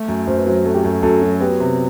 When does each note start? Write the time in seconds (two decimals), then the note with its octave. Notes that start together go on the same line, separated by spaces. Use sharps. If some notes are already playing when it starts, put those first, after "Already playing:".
Already playing: A3
0.08 F#2
0.27 F#2 C5
0.38 B4
0.47 F#3 C5
0.65 A3 A4
0.74 G4
0.83 F#2 A4
1.03 F#2 A4
1.22 F#3
1.40 B3 G4
1.60 C3